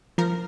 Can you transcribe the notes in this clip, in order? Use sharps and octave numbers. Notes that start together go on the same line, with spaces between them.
F3 A#4